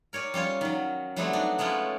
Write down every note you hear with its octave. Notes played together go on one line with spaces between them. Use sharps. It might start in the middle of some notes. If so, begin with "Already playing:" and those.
A#4 C#5 D5 G#5
G3 C#4 F4 C#5
D#3 F#3
F#3 G3 A3 B3 C4 E4
D4 D#4 F#4
G#3 A3 B3 C#4 E4 F4